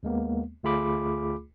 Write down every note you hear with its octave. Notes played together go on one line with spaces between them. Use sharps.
D#2 G#3 A#3 B3
D2 A3 F4 G#4 B5 D6